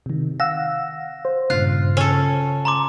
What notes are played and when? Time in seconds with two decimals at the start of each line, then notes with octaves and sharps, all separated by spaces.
0.06 C3 D#3
0.40 F5 F#5 E6 A#6
1.25 C5
1.50 G2 A#2 C#3 F4 F#6
1.97 C#3 C#4 A4
2.65 A#5 C6 D6